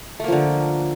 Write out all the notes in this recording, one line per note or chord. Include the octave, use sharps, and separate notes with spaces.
D3 F3 A3 A#3